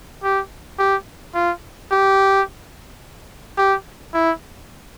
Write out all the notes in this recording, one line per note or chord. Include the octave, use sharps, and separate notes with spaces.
G4
G4
F4
G4
G4
E4